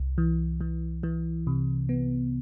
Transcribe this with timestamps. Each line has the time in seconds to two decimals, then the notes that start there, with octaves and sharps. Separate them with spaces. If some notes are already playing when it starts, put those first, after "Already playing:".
Already playing: C2
0.18 E3
0.61 E3
1.03 E3
1.47 C3
1.89 B3